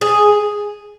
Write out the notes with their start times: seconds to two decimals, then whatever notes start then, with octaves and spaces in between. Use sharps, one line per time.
0.01 G#4